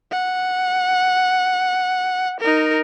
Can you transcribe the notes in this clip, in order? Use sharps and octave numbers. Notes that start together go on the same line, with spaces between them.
F#5
D#4 A#4